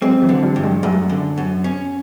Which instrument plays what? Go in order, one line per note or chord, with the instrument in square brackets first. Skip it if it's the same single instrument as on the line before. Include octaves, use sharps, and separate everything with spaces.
[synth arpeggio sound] F#3 G#3 [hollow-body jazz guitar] C4
[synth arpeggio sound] E3 F#3
[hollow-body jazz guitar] D3
[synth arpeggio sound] F3 G3
[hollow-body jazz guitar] G2
[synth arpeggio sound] F#3 G#3
[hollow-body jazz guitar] F#2 [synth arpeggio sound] G3 A3
[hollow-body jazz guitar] D3
F#2
C#4